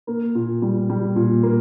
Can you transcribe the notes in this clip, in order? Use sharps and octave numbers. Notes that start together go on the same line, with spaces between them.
A#3
A#2
G3
G3
A#2
A#3